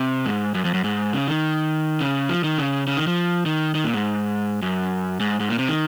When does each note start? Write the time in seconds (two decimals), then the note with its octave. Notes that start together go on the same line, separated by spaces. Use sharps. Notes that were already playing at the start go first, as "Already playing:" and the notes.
Already playing: C3
0.26 G#2
0.55 F#2
0.65 F2
0.74 F#2
0.84 G#2
1.13 C#3
1.28 D#3
2.01 C#3
2.29 F3
2.44 D#3
2.58 C#3
2.87 C#3
2.97 D#3
3.07 F3
3.46 D#3
3.75 D#3
3.84 A#2
3.94 G#2
4.62 F#2
5.20 G#2
5.40 G#2
5.49 A#2
5.59 C3
5.68 D#3